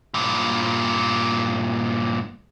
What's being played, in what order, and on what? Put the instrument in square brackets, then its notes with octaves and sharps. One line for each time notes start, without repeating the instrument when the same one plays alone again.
[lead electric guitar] G2 A#2